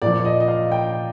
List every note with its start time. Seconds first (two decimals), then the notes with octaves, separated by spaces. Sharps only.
0.02 A#2 F3 D5
0.18 D5
0.25 D#5
0.40 D#5
0.48 F5
0.72 G5